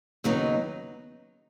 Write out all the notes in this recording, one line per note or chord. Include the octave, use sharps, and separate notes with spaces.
D#2 C#3 F#3 B3 D#4